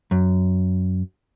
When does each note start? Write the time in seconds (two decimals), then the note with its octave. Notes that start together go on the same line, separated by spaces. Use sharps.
0.11 F#2